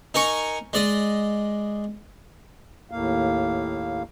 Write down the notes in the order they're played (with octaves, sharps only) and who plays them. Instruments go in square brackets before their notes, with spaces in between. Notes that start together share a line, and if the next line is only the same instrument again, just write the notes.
[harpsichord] D#4 A#4 G#5 C#6
G#3 D5 D#5
[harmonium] D#2 A2 A#3 F5